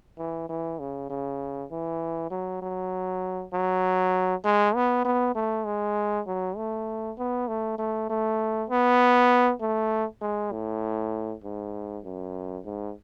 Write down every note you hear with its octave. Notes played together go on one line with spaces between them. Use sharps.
E3
E3
C#3
C#3
E3
F#3
F#3
F#3
G#3
B3
B3
A3
G#3
F#3
A3
B3
A3
A3
A3
B3
A3
G#3
A2
G#2
F#2
G#2